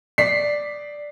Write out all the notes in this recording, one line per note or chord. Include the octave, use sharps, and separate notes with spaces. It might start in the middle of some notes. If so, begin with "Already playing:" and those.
D5 B6 C7